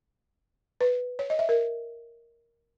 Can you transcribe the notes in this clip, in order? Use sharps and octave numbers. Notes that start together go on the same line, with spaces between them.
B4
C#5
D#5
E5
A#4